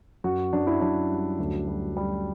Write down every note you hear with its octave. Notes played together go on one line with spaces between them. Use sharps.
F#2 F#4
F#2 D4
E4
F#2 D4
G3
D2
G3
G3